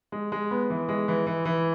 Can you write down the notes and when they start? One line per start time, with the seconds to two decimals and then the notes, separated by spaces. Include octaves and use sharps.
0.12 G#3
0.32 G#3
0.51 B3
0.70 E3
0.89 G#3
1.08 E3
1.27 E3
1.45 E3